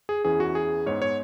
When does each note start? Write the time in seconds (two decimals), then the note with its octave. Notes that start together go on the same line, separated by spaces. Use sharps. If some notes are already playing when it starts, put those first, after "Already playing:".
0.09 G#4
0.25 E2 E3 C#4 G#4
0.40 F#4
0.55 G#4
0.86 G#2 G#3 B3 C#5
1.02 C#5